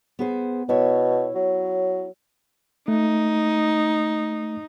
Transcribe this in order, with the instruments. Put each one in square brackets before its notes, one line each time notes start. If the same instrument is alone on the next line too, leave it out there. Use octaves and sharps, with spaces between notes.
[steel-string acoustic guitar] B3 G#4 C5
[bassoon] B2 [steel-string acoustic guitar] E4 C#5
[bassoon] F#3
[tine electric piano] A3 [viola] D#4